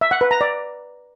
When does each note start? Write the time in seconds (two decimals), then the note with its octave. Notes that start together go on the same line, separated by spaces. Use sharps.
0.01 E5
0.11 F#5
0.21 B4
0.31 A#5
0.41 D5